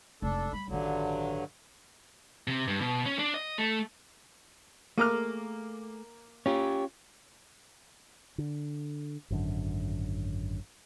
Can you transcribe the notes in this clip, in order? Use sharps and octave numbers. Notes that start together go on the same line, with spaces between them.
F1 G#3 D4 A4
G3 B5
A1 G2 D3 D#3 F#3
C3
G2
B2
C#4
D4
D#5
A3
A3 A#3 G#4 A#4 D6 F6
C#4 F4 G4 C#5
D3
G#1 F#2 D3